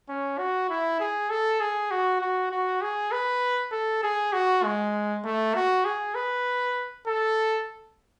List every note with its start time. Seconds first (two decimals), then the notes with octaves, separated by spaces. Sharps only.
0.09 C#4
0.39 F#4
0.70 E4
1.00 G#4
1.30 A4
1.61 G#4
1.91 F#4
2.21 F#4
2.51 F#4
2.82 G#4
3.12 B4
3.72 A4
4.03 G#4
4.33 F#4
4.64 G#3
5.24 A3
5.55 F#4
5.85 G#4
6.15 B4
7.07 A4